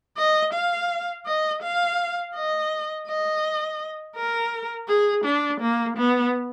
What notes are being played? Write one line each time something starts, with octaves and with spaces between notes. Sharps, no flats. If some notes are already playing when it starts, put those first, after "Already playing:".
D#5
F5
D#5
F5
D#5
D#5
A#4
G#4
D4
A#3
B3